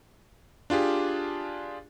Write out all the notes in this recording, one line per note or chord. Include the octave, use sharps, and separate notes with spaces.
D4 F4 G4 G#4